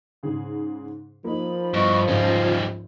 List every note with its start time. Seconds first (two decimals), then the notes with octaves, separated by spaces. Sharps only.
0.23 G#2 C#3 G#4
1.24 F3 A#3 D#4 B5
1.74 G2 B3 E4 D#5 C#6
2.08 G#1 C#2 F#2 G3 D#4 F4 G#6